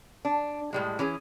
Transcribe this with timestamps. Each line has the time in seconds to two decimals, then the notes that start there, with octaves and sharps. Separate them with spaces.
0.25 D4
0.73 A2 G3 G#3
0.99 E3 C#4 G#4